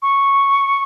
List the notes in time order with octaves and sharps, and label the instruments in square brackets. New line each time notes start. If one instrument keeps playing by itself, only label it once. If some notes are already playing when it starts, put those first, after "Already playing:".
[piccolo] C#6